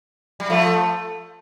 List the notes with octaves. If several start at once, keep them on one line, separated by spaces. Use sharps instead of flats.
G3
F3 A3